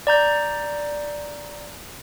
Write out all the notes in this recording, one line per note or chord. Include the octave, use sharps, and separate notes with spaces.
D5 A#5 G6